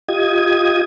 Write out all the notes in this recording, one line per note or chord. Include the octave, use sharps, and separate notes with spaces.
F4 G4 D#5 D#6 G#6